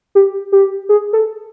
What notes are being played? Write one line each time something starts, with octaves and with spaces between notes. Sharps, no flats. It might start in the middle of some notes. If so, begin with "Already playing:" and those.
G4
G4
G#4
A4